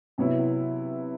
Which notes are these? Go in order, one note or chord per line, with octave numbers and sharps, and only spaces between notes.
C3 F#3 B3 E4